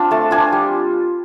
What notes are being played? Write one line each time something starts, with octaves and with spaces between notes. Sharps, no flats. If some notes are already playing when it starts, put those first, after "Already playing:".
Already playing: C4 D4 F4
A3 A5
D4 F4 G#5
G3